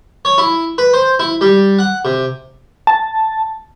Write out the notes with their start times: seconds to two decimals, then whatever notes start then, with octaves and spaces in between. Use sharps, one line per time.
0.25 C#5
0.38 E4
0.78 B4
0.94 C5
1.19 E4
1.41 G3
1.79 F#5
2.05 C3
2.87 A5